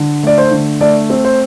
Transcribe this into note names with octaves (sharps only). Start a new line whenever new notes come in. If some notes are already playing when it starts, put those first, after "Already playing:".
Already playing: D3
A3 D5
C5
D3
A3 D5
C4
C5